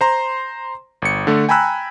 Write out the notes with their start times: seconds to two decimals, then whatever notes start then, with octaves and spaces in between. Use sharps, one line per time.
0.01 C5 A#5 C6
1.02 G1 C#7
1.27 D3 A3
1.49 G5 G#5 A#5 B5 E6 F#6